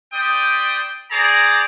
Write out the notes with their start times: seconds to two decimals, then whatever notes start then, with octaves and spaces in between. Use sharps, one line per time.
0.12 G3 C5 D5 G5 D#6
1.11 G#4 C5 D5 A#5